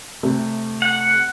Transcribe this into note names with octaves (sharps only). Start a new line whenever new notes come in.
C3 A3
F#5